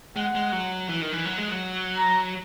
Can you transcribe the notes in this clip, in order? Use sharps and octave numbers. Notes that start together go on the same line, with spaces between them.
G#3 F#5
G#3
F#3
E3
D#3
E3
F#3
G#3
F#3
A#5